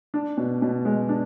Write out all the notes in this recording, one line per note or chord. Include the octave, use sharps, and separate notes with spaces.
D4
B2
B2
G#3
D4